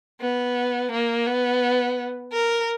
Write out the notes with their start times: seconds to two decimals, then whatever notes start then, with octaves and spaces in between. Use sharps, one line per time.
0.21 B3
0.92 A#3
1.26 B3
2.33 A#4